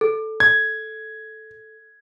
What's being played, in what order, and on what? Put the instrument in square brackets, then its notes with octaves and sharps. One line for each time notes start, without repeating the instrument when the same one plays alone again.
[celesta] A4
[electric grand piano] G#6